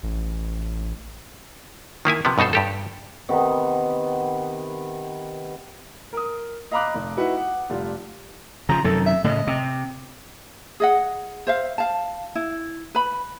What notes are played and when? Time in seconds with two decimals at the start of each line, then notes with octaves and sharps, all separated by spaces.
0.03 A1
2.05 D#3 A#3 E4 G#5
2.25 C3 F3 B3
2.38 G2 B2 D#4 A4 C5
2.53 G2 G4 A4
3.29 C3 D#3 B3
6.13 A#4 D#6
6.71 D#5 F5 A#5 B5 D6 F#6
6.94 F1
7.17 D#4 E4 F#4 B4 F#5
7.37 F#5
7.70 F1 G3 F4
8.69 C#3 F3 A#5
8.84 F#2 C3 D#3 A4
9.06 E5
9.24 A2 C#3 D#5
9.47 C3
10.80 G#4 D#5 F#5
11.47 C5 E5 F5
11.78 F5 A5
12.35 E4
12.95 B4 B5